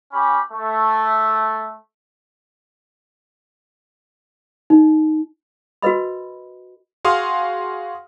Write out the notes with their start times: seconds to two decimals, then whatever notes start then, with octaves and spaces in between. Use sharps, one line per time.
0.13 C#4 G4 B5
0.53 A3
4.70 D#4
5.82 F#4 A#4 B4 D#5 B5
7.05 F#4 G#4 F5 C6 D#6 F6